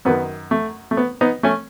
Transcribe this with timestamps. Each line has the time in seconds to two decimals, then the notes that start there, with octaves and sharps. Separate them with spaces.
0.05 F#2 D#3 B3
0.51 A3
0.91 A3
0.97 B3
1.21 B3 D#4
1.43 A3 C#4